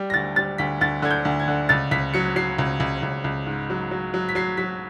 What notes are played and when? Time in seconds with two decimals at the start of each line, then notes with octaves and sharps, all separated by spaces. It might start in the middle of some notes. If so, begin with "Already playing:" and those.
Already playing: G3
0.10 A#6
0.14 D2 A6
0.36 G3 A6
0.58 D2 B6
0.81 D2 A6
1.02 D3 G#6
1.11 G6
1.25 D2
1.40 G#6
1.48 D3
1.69 C#2 A6
1.91 C#2 B6
2.14 F#3 C#7
2.36 F#3 C7
2.59 C#2
2.80 C#2
3.03 C#2
3.24 C#2
3.46 G#2
3.70 F#3
3.91 F#3
4.14 F#3
4.29 B6
4.35 F#3 C7
4.57 F#3 B6